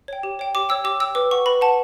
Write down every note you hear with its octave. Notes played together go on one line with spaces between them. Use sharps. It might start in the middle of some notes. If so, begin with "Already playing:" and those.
C#5 G5
G4
C#5 G5
G4 D6
C#5 G5 E6
G4 D6
C#5 G5 E6
B4 D6
F#5 C#6
B4 B5
F#5 A5